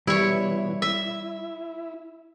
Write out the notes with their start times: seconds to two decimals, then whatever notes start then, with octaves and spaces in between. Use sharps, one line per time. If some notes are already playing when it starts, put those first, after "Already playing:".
0.07 B2 E3 G3 E4 C#5
0.82 E4 E5